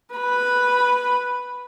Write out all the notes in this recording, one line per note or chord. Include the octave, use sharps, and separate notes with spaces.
B4 B5